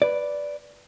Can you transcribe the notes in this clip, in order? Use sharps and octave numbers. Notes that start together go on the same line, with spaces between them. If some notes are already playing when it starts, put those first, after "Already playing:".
B4 D5